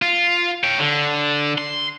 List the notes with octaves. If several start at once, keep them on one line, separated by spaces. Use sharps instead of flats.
F4
C#5 G5
D3
C6